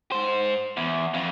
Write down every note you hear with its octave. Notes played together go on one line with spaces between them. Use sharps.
G#2 C5
E2
F2